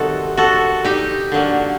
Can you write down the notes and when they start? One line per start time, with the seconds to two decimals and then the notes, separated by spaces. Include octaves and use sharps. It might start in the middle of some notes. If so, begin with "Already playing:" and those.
Already playing: C3 D#3 G3 C4 D#4 F#4 A4
0.37 F#4 A4
0.84 D#4 G4
1.32 D3 F#3 A#3